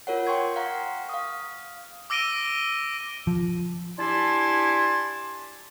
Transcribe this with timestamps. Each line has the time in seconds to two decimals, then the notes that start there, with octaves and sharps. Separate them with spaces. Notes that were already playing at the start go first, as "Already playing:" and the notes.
0.07 F4 A#4 C#5 F#5
0.27 G5 C6 C#6 G#6
0.56 F5 F#5 A#5 C#6
1.09 F5 D#6
2.10 D6 E6 A#6 D7 D#7 G7
3.27 F3
3.99 D4 E4 G4 G#5 A5 C6